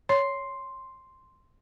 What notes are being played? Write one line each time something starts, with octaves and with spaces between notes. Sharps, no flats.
C#5 C6